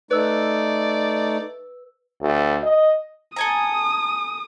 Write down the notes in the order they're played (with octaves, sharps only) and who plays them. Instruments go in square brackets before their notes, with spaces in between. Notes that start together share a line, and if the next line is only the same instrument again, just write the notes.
[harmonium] A3 D#4 [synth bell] B4 E6 [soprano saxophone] D5
[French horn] D2
D#5
[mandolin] A4 G#5 A#5 [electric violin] D#6